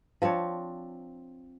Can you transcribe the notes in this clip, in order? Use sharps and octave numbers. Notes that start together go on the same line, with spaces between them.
F3 C4 D4 C#5